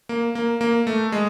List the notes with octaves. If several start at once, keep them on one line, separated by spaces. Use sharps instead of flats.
A#3
A#3
A#3
A3
G#3